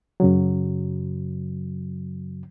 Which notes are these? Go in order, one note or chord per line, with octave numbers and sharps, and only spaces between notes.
F#2 C#3 F#3